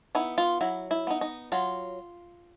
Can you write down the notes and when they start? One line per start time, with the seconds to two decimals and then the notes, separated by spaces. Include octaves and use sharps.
0.15 B3 D#4 E4
0.38 F4
0.61 F#3 E4
0.91 E4
1.07 B3 D#4
1.21 D#4
1.52 F#3 F4